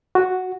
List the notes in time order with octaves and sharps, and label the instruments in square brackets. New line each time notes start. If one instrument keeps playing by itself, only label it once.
[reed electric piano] F#4